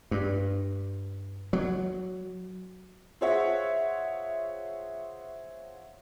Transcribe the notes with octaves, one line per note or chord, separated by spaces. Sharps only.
G2
F#3
F4 G#4 C5 C#5 E5 F#5